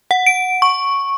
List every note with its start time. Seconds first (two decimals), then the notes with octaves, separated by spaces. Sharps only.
0.11 F#5
0.26 D7
0.62 C#6